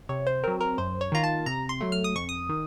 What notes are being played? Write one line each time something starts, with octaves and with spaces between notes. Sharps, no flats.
C3 C#5
C5
F#3 C4 A#4
A#4
F#2 C5
C#5
D#3 A#3 F4 A#5
A5
C3 A#5
C6
F#3 A3
F6
D#6
F2 C#6
D#6
D#3